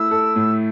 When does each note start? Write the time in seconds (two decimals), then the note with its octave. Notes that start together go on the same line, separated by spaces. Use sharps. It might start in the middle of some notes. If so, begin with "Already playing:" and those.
Already playing: A3 E4 E6
0.11 A4
0.36 A2